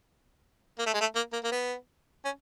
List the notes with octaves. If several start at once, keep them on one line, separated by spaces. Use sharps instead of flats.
A#3
A3
G#3
A3
A#3
A#3
A#3
B3
C#4